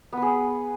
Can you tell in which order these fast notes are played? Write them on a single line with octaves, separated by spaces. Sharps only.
B3 B4 G#4